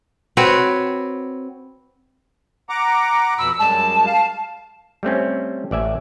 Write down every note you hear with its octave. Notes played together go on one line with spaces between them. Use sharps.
C4 F#4 B4 C#5
F#5 A#5 D6
F2 B2 B5 E6
F#2 G3 G#3 A5
F5
G3 A3 C4 C#4
A1 D5 E5 G#5